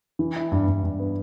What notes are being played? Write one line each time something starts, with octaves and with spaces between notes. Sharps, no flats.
E3
E4
G2
G2
G2
B3